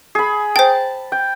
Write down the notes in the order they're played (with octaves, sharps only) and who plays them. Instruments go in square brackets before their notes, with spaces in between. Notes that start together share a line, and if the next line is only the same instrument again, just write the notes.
[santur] G#4 B5
[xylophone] C5 G5 [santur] A5
[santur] G5